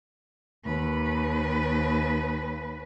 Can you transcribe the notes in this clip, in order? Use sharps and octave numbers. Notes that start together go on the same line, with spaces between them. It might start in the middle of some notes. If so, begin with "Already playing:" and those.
D#2 B4